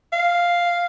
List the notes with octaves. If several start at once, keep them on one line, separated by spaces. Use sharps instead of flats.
F5